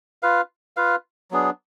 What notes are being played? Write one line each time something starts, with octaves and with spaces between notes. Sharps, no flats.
F4 B4 F5
F4 B4 F5
F#3 B3 D4 G#4